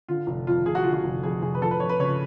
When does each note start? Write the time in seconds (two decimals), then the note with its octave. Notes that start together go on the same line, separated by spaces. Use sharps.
0.08 D3 F4
0.27 F1
0.47 F2 F4
0.66 F1 G#4
0.75 F#4
0.84 D3 F4
0.93 F#4
1.04 F1
1.23 F2 G#4
1.42 F1 G#4
1.55 B4
1.61 F3 A4
1.71 B4
1.80 F2 C#5
1.89 B4
2.00 C#3 C#5